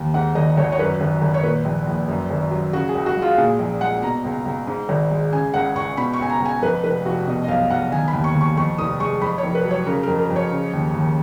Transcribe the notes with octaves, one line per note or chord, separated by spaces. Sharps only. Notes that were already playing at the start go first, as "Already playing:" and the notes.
Already playing: D#2
G#2 F#5
G#1 D#5
G#1 C#5
C#5
F#2 B4
G#1
G#1
C#5
A#2 B4
A#1
A#1
F#2
G#1
F#3
C#3 F#4
G#4
C#2
F#4
G#3
F4
A#2 G#4
A#1
G#3 F#5
B2 A#5
C#2
C#2
G#2
G#1
G#3
C#3 G#5
C#2 F#5
C#2 C#6
B2 B5
C#6
C#2 G#5
A#5
C#2
G#5
F2 B4
F1 B4
F1 F#4
B2 D#5
D#5
B1 F5
B1 F#5
D#3 G#5
B5
D#2
C#6
D#2
C#6
F2 C#6
F1 D#6
G#3 C#6
F2 B5
C#5
F1
B4
F#3
C#5
C#3 A#4
F2 A#4
A#4
F2
C#5
C#3
D#2
D#2